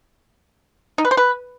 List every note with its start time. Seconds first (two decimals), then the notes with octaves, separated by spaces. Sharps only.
0.98 D#4
1.05 B4
1.11 C5
1.17 B4